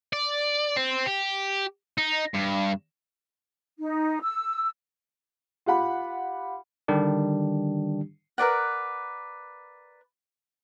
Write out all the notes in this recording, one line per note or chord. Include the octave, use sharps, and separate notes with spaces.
D5
C4
G4
D#4
G2
D#4
E6
F4 G4 F#5 B5
D3 D#3 G3 D4 G4
A#4 B4 D5 F#5